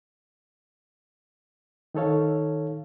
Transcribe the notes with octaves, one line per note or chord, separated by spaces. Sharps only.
D#3 D#4 A4 C#5 F5